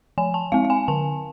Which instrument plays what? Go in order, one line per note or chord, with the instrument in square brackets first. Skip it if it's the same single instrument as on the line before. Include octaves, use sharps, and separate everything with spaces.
[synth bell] F3 G#5
A5
G#3 C4 F5
F5
G#5
D3 A5